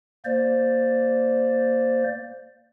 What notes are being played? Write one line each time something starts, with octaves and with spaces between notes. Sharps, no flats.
A#3 C5 D5